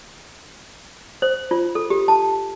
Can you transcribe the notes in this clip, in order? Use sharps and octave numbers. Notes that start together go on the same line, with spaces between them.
C5
F4
A4
G4
A5